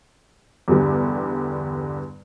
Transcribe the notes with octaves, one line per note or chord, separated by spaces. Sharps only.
E2 G2 D3 G3